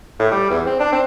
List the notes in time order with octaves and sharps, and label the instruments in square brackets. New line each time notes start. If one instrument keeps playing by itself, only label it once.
[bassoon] A2
G3
E2
C4
D4
C4